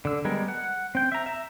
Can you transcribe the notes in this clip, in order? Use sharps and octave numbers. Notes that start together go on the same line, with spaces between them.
D3 E6
G3 G#3 B3 A#4
F#5
C4 G5
E5 A#5
E5 A#5